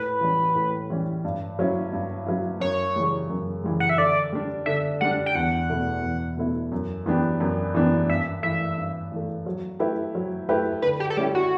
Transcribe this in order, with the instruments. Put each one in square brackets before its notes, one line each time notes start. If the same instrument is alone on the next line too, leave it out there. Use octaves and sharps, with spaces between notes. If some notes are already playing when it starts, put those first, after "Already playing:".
Already playing: [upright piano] A2 [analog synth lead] B4
[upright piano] E3 G3 C#4
A2
E3 G3 C#4
G2
F#3 C#4 E4
G2
F#3 C#4 E4
[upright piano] F#2 [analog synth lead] C#5
[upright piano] C#3 E3 G3
F#2
C#3 E3 G3
[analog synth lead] F#5
E5
[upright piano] D3 [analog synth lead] D5
[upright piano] G3 D4
[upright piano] D3 [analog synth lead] E5
[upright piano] G3 D4 [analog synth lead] F#5
[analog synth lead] G5
[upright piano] E2 [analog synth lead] F#5
[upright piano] B2 A3 E4
E2
B2 A3 E4
F#2
E3 B3 D4 G4
F#2
E3 B3 D4 G4
[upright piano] G2 [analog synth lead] E5
[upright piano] E3 A3 [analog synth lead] E5
[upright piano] G2
E3 A3
F#3
A3 E4 G4 B4
F#3
A3 E4 G4 B4
[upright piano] D3 [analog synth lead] B4
[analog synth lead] G4
A4
[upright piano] G3 C#4 E4 [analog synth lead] G4
[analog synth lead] F#4